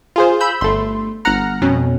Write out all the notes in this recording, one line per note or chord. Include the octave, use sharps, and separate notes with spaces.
F4 G#4 C5
B5 E6 G6
G1 A3 C6
G1 F#5 A#5 F6
F2 B2 C#4